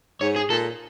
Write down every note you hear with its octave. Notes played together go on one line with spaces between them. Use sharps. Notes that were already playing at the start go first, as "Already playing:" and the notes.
G#2 C#5
G#4
A#2 A4